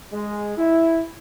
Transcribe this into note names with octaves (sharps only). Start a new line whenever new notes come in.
G#3
E4